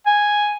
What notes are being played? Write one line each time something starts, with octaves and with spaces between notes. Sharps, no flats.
G#5